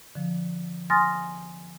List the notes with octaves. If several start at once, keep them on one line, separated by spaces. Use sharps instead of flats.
D3 F3
G#5 C6 D#6 F6 A6 A#6